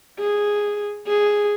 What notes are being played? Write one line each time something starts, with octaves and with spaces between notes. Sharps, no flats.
G#4
G#4